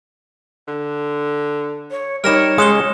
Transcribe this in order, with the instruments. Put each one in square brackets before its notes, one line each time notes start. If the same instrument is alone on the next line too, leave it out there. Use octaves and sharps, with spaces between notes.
[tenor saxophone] D3
[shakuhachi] C#5
[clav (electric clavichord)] G3 D#4 [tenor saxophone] A#4 [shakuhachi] C#5 [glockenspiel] F6 A#6 E7
[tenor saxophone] C#3 [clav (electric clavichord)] G#3 [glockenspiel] D#6 E7 G7